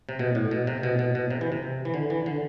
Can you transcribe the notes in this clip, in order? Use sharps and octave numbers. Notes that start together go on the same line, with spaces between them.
C3
B2
A2
B2
C3
B2
B2
B2
C3
E3
C3
E3
D3
E3
D3